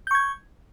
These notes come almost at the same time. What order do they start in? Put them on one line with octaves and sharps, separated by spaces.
G6 C#6 G#6